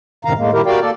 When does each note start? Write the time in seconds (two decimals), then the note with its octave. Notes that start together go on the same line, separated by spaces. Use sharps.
0.25 F#2 A2 C3 D#3 F5 A#5
0.38 A2 G#3 A#3
0.53 G2 A#2 D#3 E4 G4 A#4
0.66 F#4 G4 A#4 D5 F5 G5
0.81 A#3 A4 D5